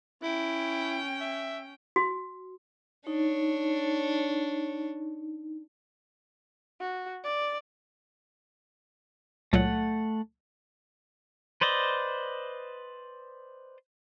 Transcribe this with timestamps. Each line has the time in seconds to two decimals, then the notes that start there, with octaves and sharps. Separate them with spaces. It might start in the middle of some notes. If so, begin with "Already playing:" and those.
0.23 C#4 E4 G5
1.21 E5
1.96 F#4
3.07 D4 D#4 C#5
6.80 F#4
7.24 D5
9.53 C#2 A#2 F#3 A3 F#5
11.61 B4 C5 D5 D#5